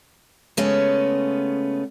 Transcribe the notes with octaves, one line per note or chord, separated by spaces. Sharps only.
C#3 G#3 A3 B3 C#4